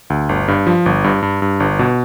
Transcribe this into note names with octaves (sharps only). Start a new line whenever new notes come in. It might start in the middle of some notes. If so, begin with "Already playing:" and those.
D2
G1
G2
F3
G1
G2
G2
G2
G1
B2